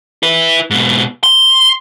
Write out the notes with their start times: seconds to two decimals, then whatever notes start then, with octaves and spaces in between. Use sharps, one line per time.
0.23 E4 B4
0.70 G#2 B2
1.23 C6